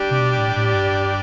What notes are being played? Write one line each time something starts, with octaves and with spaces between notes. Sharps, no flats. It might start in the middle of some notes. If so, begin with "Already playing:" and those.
Already playing: G3 D4 G4 D5
C3
B2
A2
A2
G2